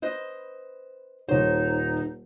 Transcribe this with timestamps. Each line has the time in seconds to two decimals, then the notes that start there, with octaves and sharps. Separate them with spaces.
0.02 B4 C5 D#5
1.28 D#1 D#4 C5 C#5